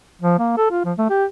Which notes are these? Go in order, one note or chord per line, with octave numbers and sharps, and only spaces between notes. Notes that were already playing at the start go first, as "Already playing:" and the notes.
F3
A#3
A4
F4
F3
A3
G4